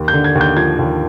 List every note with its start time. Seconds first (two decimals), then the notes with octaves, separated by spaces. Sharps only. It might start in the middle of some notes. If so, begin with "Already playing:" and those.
Already playing: D#2
0.08 G6
0.13 D3
0.24 G#6
0.35 D#2
0.41 G6
0.57 F3 G#6
0.79 D#2